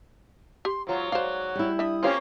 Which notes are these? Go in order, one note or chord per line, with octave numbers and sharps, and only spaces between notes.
G4 C6
G#2 F#3 F4
F#4 C5 D5 F5
G3 E4
D4 E5 D#6
A#3 C4 C#4 F4 G4 F5